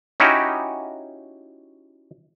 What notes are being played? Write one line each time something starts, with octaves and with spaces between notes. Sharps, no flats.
C#4 D#4 E4 F#4 G4